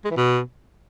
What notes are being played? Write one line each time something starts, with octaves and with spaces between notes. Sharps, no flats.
G#3
E3
B2